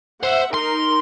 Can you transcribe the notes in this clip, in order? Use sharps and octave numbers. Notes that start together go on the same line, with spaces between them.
C5 E5 F#5
D#4 A#4 C6